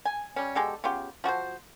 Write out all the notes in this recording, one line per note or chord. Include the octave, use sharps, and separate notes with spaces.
G#5
G3 C#4
B2 G#3 G4 A4
C#3 B3 F4 G4
F3 F#4 G#4 C5